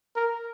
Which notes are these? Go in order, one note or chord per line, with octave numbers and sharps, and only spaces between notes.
A#4